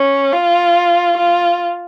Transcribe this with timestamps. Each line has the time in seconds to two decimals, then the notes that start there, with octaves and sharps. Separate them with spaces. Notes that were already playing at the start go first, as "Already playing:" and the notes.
Already playing: C#4
0.33 F4
1.18 F4